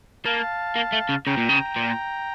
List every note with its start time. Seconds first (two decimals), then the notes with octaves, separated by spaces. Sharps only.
0.25 A#3 F5 A5
0.76 A#3
0.92 A3
1.09 C#3
1.26 C#3 G5 A#5
1.37 A#2
1.49 C#3
1.76 A#2